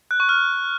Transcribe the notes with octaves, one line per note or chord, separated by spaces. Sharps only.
F#6
C#6
F6